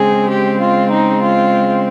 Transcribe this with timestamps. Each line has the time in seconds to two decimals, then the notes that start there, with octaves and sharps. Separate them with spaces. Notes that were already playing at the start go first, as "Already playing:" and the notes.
Already playing: C#3 G#3 C4 G#4
0.29 G4
0.60 F4
0.91 D#4
1.22 F4